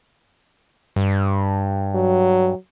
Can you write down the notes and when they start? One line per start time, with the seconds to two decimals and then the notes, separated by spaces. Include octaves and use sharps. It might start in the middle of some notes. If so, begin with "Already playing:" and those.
0.96 G2
1.95 F#3